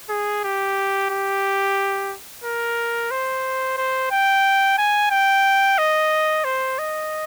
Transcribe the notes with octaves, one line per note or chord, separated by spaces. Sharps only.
G#4
G4
G4
A#4
C5
C5
G5
G#5
G5
D#5
C5
D#5